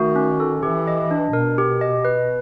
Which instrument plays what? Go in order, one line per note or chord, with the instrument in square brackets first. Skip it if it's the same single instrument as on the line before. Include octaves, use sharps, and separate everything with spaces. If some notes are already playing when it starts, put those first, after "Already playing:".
Already playing: [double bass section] D#3 [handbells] A3 F#4
[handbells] C#4
A4
[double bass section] E3 [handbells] G4
[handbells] D#5
D4
[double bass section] B2 [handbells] A#4
[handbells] G4
D#5
B4